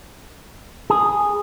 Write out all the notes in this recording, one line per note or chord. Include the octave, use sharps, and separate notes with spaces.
G#4